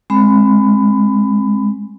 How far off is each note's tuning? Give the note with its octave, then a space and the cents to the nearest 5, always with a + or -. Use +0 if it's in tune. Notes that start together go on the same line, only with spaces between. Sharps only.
G#3 +0 C4 +25 B5 +20